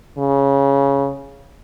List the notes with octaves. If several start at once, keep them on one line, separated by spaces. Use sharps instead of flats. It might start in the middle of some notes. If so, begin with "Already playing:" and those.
C#3